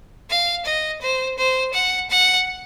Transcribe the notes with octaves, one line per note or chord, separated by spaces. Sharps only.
F5
D#5
C5
C5
F#5
F#5